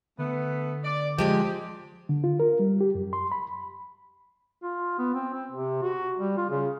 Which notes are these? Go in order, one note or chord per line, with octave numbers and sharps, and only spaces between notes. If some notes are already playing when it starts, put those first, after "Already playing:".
D3 A3 B3
D5
F3 G#3 G4 G#5
D3
F4
A#4
G3
G4
F#2
C6
B5
F4
B3
C4
C4
C3
F#4
G3
F4
C#3